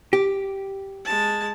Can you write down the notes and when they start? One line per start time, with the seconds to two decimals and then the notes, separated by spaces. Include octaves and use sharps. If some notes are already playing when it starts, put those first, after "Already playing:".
0.13 G4
1.05 G#3 A5